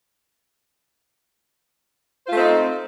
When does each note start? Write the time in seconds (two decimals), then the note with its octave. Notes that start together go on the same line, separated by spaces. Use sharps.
2.25 C5
2.29 F4
2.32 A3
2.36 C4
2.39 D#4